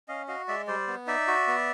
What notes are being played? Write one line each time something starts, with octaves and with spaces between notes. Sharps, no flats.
C#4 D#5 F5
F#4 D#5 F5
G#3 D5 E5
G3 C5 D5
B3
D#4 D5 E5
F#4
B3